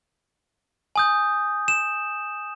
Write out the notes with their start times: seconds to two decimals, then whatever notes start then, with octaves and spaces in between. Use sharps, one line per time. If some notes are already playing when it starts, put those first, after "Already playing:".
0.96 G#5 D#6 G6
1.68 E7